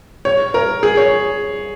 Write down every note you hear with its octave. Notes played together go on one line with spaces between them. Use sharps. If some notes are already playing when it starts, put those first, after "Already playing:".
C#5
A#4
G#4
C#5